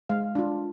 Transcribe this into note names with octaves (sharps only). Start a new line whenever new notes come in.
G#3 F5
D4 F4